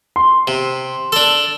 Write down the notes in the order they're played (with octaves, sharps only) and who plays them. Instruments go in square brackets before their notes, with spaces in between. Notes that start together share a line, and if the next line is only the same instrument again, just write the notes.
[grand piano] C6
[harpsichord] C3
D4 A4